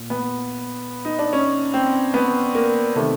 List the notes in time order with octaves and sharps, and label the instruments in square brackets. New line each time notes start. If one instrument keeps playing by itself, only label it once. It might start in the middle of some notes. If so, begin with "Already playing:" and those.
Already playing: [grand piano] A#2
B3
D#4
D4
C#4
C4
B3
A#3
C3 D#3 A3